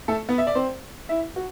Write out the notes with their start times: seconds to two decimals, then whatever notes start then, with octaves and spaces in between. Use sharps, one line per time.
0.08 A3 A4
0.29 B3 B4
0.38 E5
0.47 D5
0.55 C4 C5
1.09 E4 E5
1.36 F#4